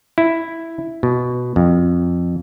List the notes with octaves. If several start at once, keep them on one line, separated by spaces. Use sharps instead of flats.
E4
B2
F2